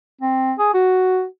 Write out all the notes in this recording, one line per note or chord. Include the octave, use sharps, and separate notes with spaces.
C4
G#4
F#4